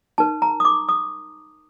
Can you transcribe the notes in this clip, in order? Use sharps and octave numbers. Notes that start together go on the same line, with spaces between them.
D#4 A#4 A5
A#5
D#6
D6
D#6